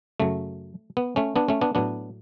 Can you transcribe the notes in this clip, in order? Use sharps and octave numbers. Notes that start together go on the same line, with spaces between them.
F#2 C#3 F#3 A3
B3
A3 C#4
B3 D4
A3 C#4
B3 D4
A2 F#3 B3 D4